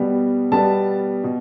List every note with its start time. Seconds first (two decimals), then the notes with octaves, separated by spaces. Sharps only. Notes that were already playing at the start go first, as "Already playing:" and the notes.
Already playing: B2 G3 B3
0.51 B2 G3 B3 A5
1.24 B2